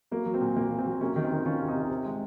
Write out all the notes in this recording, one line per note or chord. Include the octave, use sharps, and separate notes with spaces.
F#3 A#3
F#3
C4
A#2
A#2 A#3
F#3
C4
F#3
C3 A#3 C#4
D#3 C#4
C4 D#4
D#3
D#3 C#4 F4
C3
C4 D#4
C3
C3 C4
G#3